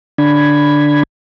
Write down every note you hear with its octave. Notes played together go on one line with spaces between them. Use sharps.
D3 D4 B5 G#6